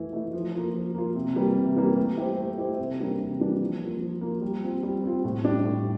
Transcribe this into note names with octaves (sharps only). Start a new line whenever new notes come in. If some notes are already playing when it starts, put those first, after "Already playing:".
Already playing: E3 A3 E4
A3 E4
F3
A#3 F4
F3
A#3 F4
C3
E3 G3 A#3
C3
E3 G3 A#3
A3
E4 G4 C5
A3
E4 G4 C5
C3
E3 G3 A#3 D4
C3
E3 G3 A#3 D4
F3
A#3 F4
F3
A#3 F4
G3
C4 F4
G3
C4 F4
A2
G3 D4
A2